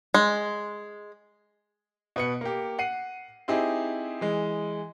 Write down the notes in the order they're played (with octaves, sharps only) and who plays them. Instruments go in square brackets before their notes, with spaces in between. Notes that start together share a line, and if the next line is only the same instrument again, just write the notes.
[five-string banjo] G#3
[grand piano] B2 B4 C#7
A#3 G4
F#5 C7 D#7
C4 D#4 E4 G4 G#4
E3 G#3